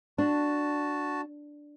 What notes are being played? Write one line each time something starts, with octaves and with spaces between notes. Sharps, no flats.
D4 F#4 A5